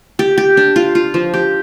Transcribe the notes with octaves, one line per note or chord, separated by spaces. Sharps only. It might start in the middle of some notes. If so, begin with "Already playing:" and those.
G4
G4
D4
F4
F4
F3
G4